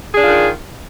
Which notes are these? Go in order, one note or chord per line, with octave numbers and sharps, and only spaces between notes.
D#3 D4 F4 G#4